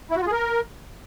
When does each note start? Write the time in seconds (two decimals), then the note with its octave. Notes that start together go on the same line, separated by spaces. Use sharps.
0.11 E4
0.16 F#4
0.21 F4
0.27 G#4
0.32 A#4